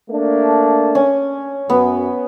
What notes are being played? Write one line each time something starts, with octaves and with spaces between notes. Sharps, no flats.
A3 A#3 D4
C#4
F#2 B3